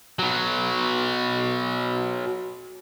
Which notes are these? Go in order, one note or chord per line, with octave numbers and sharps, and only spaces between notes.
B2 F#3